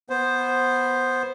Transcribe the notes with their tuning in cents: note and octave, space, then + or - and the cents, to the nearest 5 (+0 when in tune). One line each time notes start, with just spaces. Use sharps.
B3 +0 C5 +0